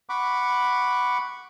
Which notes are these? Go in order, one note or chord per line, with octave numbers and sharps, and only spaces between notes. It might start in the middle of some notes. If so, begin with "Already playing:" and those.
F#5 B5 C#6 D6